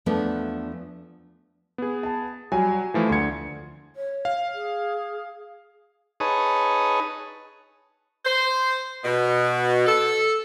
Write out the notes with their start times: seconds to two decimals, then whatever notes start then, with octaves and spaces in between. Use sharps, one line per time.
0.06 E2 F3 A3 B3 D4
1.78 B3 G#4
2.03 A5
2.52 F#3 G3 G#5
2.94 E3 F3 A3
3.09 D2 C6 G#6 C#7
3.96 C#5
4.25 F5
4.54 G#4
6.20 D#4 G#4 B4 C#5 A5 D#6
8.26 C5
9.04 B2
9.87 A4